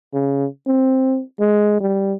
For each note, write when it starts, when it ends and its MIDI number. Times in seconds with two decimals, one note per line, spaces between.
0.13 0.46 49
0.66 1.21 60
1.40 1.78 56
1.80 2.15 55